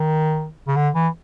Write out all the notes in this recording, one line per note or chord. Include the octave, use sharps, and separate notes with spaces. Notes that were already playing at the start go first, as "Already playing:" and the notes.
Already playing: D#3
C#3
D3
E3